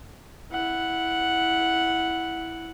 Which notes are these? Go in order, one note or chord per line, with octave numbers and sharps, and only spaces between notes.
E4 F#5